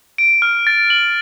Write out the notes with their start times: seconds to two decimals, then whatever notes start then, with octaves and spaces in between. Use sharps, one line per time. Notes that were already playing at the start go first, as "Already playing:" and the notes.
0.18 D7
0.42 F6
0.67 A6
0.90 F#7